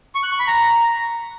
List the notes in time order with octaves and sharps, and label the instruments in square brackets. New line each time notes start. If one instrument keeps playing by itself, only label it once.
[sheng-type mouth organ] C#6
F#6
C#6
B5
A#5